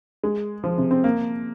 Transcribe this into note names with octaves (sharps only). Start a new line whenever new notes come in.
G#3
F3
C3
C4
A#3